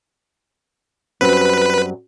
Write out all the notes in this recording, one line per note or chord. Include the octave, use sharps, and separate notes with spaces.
F#2 G3 C4 B4